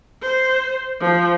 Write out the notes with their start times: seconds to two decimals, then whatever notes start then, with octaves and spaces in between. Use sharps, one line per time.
0.22 C5
1.01 F3